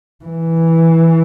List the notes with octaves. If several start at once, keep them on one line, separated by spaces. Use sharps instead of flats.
E3